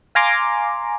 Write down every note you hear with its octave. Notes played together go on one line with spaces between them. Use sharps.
F5 G#5 A#5 C6 D6